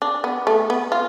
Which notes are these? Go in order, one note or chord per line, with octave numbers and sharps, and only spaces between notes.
D4
B3
A3
B3
F4